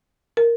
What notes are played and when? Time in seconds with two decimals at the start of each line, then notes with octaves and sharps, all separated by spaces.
0.37 A#4